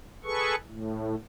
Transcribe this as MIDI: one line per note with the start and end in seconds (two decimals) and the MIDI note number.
0.24 0.55 68
0.24 0.55 69
0.24 0.55 71
0.24 0.55 85
0.66 1.15 45